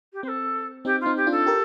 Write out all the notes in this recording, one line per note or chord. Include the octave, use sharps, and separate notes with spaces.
G4
C4 A4 C5
C4 D#4 G4
F4
C4 D#4
G4
D4 F4
A4
G4 A#4